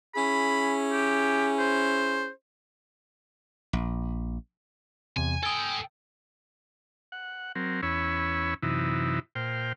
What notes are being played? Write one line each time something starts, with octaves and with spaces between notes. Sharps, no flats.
C#4 E4 G#4 B5
G4
C5
A#1
E2 C3 G#5
A4 G5 G#5 D#6
F#5
F#3 C4 A#4
E2 C#4 C#5 B5 E6
F#2 C3 E3 D#4 E4
A#2 C5 G5 F6